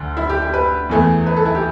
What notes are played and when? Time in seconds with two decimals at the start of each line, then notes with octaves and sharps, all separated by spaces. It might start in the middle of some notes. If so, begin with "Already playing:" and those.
Already playing: D2 D3
0.17 E4
0.29 G4
0.42 G4
0.54 B4
0.90 E2 E3 A3
1.27 B4
1.37 A4
1.46 E4
1.55 G4